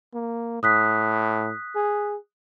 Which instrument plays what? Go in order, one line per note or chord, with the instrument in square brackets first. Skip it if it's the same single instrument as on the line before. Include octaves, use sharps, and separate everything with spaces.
[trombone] A#3
[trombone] A2 [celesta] D#6 F#6 B6
[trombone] G#4